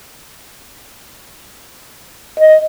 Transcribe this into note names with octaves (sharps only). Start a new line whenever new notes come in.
D#5